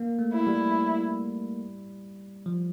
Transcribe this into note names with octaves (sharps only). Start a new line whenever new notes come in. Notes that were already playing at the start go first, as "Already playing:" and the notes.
Already playing: A#3
A3
E4
G3
F3